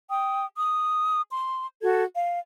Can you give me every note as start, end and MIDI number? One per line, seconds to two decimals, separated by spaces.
0.10 0.45 79
0.10 0.45 87
0.57 1.22 87
1.32 1.65 84
1.82 2.03 66
1.82 2.03 69
1.82 2.03 92
2.15 2.38 77